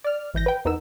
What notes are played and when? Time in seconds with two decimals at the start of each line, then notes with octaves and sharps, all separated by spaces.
0.04 D5 F6
0.34 G#1 E3 G6 A#6
0.46 B4 G5
0.65 E2 B3 D#4 A#4 E6